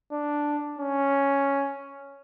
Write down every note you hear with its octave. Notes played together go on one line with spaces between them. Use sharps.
D4
C#4